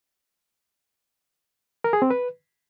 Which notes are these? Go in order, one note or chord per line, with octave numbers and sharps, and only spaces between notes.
A#4
G#4
C4
B4